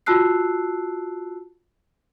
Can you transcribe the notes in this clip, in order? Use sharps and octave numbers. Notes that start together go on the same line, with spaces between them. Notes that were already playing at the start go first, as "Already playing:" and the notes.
F4 F#4 A5 E6 F#6 C7